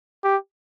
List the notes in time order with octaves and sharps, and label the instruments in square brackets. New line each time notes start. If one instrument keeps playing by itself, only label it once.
[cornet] G4